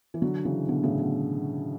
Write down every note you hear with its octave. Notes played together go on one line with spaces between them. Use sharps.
E3
D3 F#3
C#3 E3
B2 D3
A2 C#3
B2